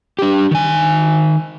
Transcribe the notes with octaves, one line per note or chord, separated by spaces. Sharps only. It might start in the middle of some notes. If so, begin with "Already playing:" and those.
D4 G4
D#3 G#5